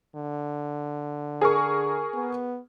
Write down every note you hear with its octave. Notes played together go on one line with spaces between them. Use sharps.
D3
G#4 A#4 C#6
B3